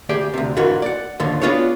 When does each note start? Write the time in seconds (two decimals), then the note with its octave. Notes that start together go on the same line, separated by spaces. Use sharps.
0.09 D2 G4 G#4 D5
0.34 D2 C3
0.56 F2 G#2 D3 E3 F#4 A#4
0.82 D5 F#5
1.20 D#2 G#2 D3 F3
1.41 B3 D4 F4 F#4 G#4 C#5